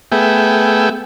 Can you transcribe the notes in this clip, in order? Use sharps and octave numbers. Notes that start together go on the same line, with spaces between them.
A3 B3 G#4 E5 G5